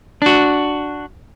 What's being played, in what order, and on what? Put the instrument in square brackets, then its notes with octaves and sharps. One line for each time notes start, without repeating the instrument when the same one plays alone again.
[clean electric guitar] D4 F#4